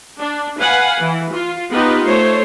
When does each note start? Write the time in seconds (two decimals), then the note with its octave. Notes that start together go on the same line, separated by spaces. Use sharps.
0.20 D4
0.59 B4 F5 F#5 G#5
1.01 E3
1.33 F4
1.73 B3 D#4 F4 G4 B4
2.06 A3 C5 C#5